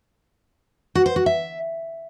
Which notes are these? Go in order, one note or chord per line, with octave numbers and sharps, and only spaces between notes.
F#4
C5
F#4
E5